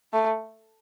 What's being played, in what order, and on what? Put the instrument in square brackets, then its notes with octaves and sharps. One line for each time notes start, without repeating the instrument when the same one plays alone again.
[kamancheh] A3